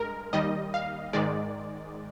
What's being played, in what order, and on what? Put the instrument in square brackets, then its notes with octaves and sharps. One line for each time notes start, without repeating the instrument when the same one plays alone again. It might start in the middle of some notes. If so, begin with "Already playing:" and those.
Already playing: [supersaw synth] G2 G#3 A#4
D#2 D#3 G3 D#5
F5
G#2 D#3 G#3 D5